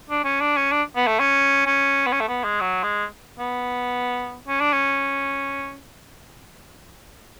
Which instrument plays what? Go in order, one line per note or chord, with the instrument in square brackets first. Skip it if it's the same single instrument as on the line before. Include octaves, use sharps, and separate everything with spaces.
[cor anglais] D4
C#4
D4
C#4
D4
B3
A3
C#4
C#4
B3
C#4
A3
B3
G#3
F#3
G#3
B3
C#4
D4
C#4